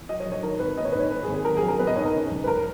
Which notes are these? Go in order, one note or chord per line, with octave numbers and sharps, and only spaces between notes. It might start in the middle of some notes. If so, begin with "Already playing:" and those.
Already playing: E2
F#3 D#5
C#5
A#1
C#5
D#3 A#4
G#1 B4
A#3 D#5
C#5
G#2 B4
C#5
D#3 B4
G#4
G#1
G#4
F#3 A#4
G#4
A#1
A#4
B3 B4
D#5
G#2 C#5
A#4
C#3
E1
B4
G#3 A#4